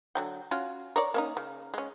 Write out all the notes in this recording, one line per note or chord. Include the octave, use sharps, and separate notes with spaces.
D3 F#3 G5
C#4 F4 F#4
A#4 C#5 D5
A#3 C#4 D#4
C#3
G#3 C#4